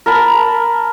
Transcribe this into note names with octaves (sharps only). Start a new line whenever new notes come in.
A#4 A5 B5